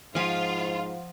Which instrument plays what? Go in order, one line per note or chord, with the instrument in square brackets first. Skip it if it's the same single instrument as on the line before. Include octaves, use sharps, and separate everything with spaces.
[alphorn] G#2 [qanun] F3 G#5 [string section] F4 [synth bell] C5 F#5